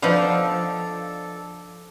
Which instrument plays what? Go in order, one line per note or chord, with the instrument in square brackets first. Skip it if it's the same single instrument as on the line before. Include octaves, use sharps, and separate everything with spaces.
[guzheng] F3 F5 [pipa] B3 D#4 [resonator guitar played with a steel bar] D4 [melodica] A4